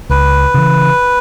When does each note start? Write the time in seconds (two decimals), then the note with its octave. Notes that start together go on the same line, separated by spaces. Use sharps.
0.09 C#2 B4
0.54 C#3 E3